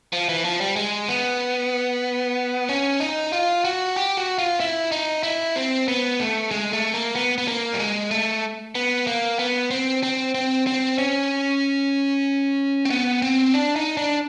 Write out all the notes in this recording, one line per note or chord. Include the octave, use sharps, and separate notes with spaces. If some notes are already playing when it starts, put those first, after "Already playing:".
F3
E3
F3
G3
G#3
B3
C#4
D#4
F4
F#4
G4
F#4
F4
E4
D#4
E4
C4
B3
A3
G#3
A3
A#3
B3
B3
A#3
G3
G#3
A3
B3
A#3
B3
C4
C4
C4
C4
C#4
C4
B3
C4
D4
D#4
D4